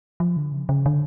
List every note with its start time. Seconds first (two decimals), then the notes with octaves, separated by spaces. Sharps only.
0.20 F3
0.37 D3
0.52 C#3
0.69 C#3
0.86 D3